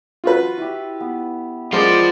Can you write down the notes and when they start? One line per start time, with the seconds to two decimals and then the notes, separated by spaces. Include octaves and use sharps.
0.24 F4 F#4 B4
0.57 E4 G4
1.00 B3
1.73 F3 G#3 B3 F4 A#4 C5 D5 D#5